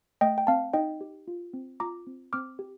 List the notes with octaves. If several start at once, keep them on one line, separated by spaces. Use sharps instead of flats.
A3 D#5 G5
G5
C4 F5 A5
D#4 D#5 G5
G4
F4
C4
F4 A#5 D6
C4
C4 D6 F6
G4